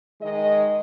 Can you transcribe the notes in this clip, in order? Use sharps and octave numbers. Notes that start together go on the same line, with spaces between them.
D#3 G#3 D#5